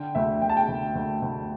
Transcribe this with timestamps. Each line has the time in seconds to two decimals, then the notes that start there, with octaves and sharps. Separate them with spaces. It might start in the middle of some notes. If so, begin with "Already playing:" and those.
Already playing: D3 G5
0.15 D2 E5
0.42 D2 G5
0.49 A5
0.57 G5
0.68 D2
0.95 D2
1.22 D2